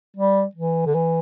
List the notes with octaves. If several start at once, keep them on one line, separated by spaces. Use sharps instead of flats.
G3
E3
D3
E3